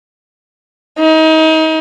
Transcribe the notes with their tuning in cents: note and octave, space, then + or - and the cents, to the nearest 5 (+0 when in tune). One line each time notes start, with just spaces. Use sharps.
D#4 +30